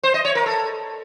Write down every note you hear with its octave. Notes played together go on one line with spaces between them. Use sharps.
C5
D#5
C#5
A#4
A4